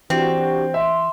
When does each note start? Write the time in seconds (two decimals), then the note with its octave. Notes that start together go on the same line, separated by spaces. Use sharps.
0.10 E3 C4 D4 F#4 G4
0.74 E5 C6